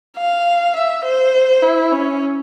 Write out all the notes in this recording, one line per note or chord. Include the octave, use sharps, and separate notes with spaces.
F5
E5
C5
E4
C#4